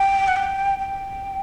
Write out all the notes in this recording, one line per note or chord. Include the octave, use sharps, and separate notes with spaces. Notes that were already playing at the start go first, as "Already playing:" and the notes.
Already playing: G5
F#5
G5
G5